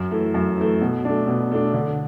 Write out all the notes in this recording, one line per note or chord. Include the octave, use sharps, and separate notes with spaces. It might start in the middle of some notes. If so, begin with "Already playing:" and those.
Already playing: F#2
E3 A3
F#2
E3 A3
B2
A3 D4
B2
A3 D4
D3